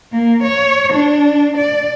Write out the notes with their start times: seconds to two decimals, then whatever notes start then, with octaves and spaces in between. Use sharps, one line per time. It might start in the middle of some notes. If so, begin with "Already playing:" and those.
0.13 A#3
0.43 C#5
0.93 D4
1.57 D5